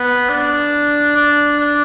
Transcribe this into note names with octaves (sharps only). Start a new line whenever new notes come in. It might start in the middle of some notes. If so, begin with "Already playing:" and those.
Already playing: B3
D4
D4
D4